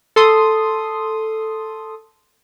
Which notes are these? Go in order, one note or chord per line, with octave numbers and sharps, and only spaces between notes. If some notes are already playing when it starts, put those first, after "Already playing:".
A4 C6 D#6